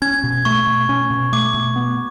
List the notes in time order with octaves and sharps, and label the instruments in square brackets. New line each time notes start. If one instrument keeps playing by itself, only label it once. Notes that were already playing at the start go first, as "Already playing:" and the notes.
[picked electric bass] C#4 [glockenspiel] G#6
[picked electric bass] B2
[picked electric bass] A3 [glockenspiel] C#6
[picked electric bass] B2
C#4
B2
[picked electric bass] A3 [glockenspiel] D6
[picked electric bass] B2
B3